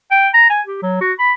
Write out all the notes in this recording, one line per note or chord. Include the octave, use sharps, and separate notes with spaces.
G5
A#5
G#5
G4
F#3
F#4
B5